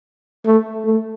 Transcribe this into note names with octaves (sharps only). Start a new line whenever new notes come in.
A3
A3